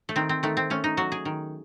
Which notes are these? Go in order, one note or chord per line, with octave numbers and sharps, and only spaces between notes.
A3
D#3 C4
C4
D#3 A3
C4
A3 C#4
D#4
F#3 F#4
G#4
D#3